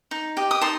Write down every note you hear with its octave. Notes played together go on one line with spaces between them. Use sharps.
D#4
G4 D#5
D#6
D#4 A5 C6